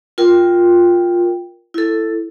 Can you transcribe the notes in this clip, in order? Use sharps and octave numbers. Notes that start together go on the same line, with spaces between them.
F4 A#4 G5
E4 A4